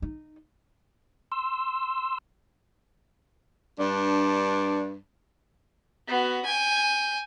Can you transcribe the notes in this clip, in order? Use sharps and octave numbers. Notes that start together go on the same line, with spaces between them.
D#4
C6 E6
G2 D4
B3 F#4
G5 G#5